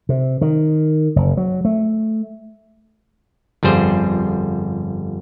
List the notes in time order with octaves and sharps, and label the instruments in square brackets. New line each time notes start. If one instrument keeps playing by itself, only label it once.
[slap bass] C3
D#3
F#1
F#3
A3
[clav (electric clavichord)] G1 F2 G3 G#4 C5